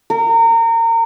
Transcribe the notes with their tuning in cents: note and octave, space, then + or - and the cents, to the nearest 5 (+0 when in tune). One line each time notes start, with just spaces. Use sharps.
A#4 -30